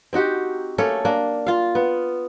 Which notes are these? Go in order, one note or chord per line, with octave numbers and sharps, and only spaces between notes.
C4 D#4 F#4 G4
A3 A#3 C#4 A4
A#3 D4
F4 F5
B3